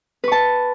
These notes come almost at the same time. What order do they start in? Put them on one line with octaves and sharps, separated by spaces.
B4 C#6 A5